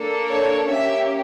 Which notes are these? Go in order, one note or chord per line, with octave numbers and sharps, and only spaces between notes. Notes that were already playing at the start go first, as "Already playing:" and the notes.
Already playing: A#3 D4 A4
C#5
A#3 C#4 G4 E5